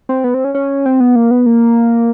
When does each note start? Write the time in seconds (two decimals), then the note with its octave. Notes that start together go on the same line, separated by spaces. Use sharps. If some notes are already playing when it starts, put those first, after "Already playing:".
0.09 C4
0.24 B3
0.34 C4
0.44 C#4
0.55 C#4
0.86 C4
1.00 B3
1.16 A#3
1.31 B3
1.46 A#3